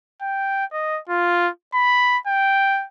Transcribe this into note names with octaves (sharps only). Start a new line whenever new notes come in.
G5
D#5
F4
B5
G5